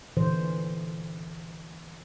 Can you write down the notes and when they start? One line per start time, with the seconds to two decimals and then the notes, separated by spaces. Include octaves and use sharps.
0.17 A#2 D3 E3 C5